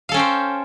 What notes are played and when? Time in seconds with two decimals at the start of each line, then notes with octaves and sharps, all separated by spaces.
0.09 F5
0.12 A4
0.14 C#4
0.17 G5
0.19 C5